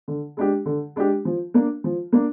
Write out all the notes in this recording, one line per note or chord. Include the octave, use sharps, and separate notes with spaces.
D3
G#3 D4 G4
D3
G#3 D4 G4
F3
A#3 D4
F3
A#3 D4